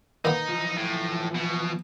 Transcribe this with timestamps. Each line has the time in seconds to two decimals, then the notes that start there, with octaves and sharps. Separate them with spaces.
0.25 D#3 A#3 B3 D#4
0.49 E3 F3
0.77 A2
1.35 B2